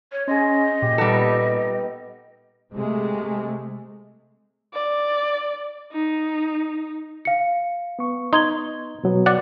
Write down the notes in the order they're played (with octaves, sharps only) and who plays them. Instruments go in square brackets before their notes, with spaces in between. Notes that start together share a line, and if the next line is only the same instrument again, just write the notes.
[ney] C#5
[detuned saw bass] C#4 [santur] G#4 C5 [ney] D#5
[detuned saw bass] A#2 [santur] G4
[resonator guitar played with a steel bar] G3 A4 [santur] B3 D#4 B4
[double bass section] C3 G#3 A3
[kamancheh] D5
D#4
[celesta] F5 C#7
[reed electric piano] B3 C#6
[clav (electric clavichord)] D#4 [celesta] C6 G#6 G7
[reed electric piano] B2 F#3 B3
[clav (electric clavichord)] D5 F#5